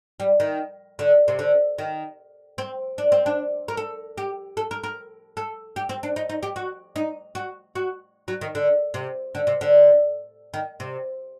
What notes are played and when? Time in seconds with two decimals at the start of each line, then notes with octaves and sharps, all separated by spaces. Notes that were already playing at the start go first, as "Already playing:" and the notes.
0.20 G3
0.40 D#3
0.99 D3
1.28 C3
1.39 D3
1.78 D#3
2.58 C4
2.98 D4
3.12 C4
3.26 D4
3.68 A#4
3.77 A4
4.18 G4
4.57 A4
4.71 A#4
4.83 A#4
5.37 A4
5.76 G4
5.89 C4
6.03 D4
6.16 D#4
6.29 D#4
6.43 G4
6.56 F#4
6.96 D#4
7.35 F#4
7.75 F#4
8.28 F#3
8.41 D#3
8.55 D3
8.94 C3
9.35 D3
9.47 C3
9.61 D3
10.54 D#3
10.80 C3